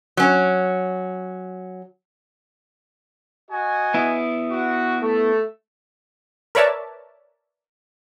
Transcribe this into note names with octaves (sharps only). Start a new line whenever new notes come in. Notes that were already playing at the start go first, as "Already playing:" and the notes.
F#3 C#4
F#4 D#5 G#5
B3 E4
F#4
A3
A#4 B4 C#5 D5 E5 A5